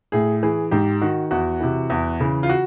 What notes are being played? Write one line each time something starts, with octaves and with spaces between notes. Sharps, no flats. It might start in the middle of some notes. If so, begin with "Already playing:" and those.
A2 G#4
E3 G#4
G#2 G4
D#3 F#4
E2 F#4
C3 E3
E2
C#3 E3
F4
F#4